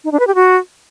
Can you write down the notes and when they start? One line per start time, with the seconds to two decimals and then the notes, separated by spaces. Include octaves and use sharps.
0.04 D#4
0.12 D4
0.20 B4
0.27 G4
0.35 F#4